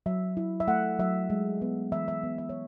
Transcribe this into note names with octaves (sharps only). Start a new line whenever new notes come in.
F#3 E5
E4
E5
A3 F#5
F#3 E5
G#3
B3
E3 E5
E5
B3
E5
C#5